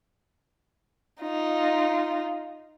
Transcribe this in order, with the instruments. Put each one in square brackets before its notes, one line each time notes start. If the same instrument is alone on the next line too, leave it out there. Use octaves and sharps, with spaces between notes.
[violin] D#4 F4